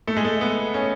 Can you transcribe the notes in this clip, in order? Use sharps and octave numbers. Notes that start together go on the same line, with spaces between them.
A3
G#3
A3
B3
C#4